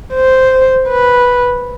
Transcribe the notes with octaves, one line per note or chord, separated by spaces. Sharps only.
C5
B4